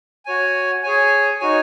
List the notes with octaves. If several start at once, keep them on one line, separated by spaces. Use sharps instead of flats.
F#4 C#5 G#5
G#4 C#5 G#5
D#4 F#4 C#5 G#5